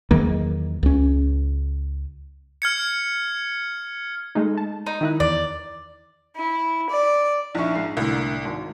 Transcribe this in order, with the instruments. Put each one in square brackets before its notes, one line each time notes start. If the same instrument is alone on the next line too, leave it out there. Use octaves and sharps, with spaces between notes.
[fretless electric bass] E2 D#3 F#3 A#3
C#2 C#4
[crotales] F6 G#6 C#7
[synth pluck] G#3 A3 D#4
A5
[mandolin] D#4
[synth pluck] D#3 E4 F#6
[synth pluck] E2 [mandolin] D5
[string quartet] E4
D5
[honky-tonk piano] A#1 E4 [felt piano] D#4 C#6
[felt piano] G#2 C7
[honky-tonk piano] C2 [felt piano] A2 D3 A#3
[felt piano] G#1